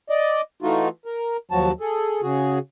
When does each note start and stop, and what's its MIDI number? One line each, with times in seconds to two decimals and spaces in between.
0.10 0.41 74
0.10 0.41 75
0.62 0.89 52
0.62 0.89 57
0.62 0.89 63
0.62 0.89 65
0.62 0.89 66
1.05 1.37 70
1.51 1.72 39
1.51 1.72 53
1.51 1.72 54
1.51 1.72 66
1.51 1.72 81
1.81 2.21 68
1.81 2.21 69
2.22 2.59 49
2.22 2.59 66
2.22 2.59 68